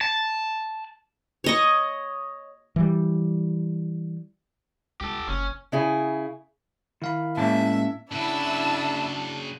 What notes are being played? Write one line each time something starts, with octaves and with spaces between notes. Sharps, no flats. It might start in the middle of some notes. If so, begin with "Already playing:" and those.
A5
C#5 D#5 C#6
E3 G3
C#2 G4 A4
F#1 C#4
C#3 E4 G#4
D#3 E4 F5 B5
A2 G#3 A#3 C#4 E5 A5
C#3 D4 E4 F#4 A5 E6